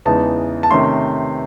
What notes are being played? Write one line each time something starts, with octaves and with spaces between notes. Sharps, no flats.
E2 C#3 E3 G#3 D#4 A5
A5
C3 D#3 A3 C#4 C6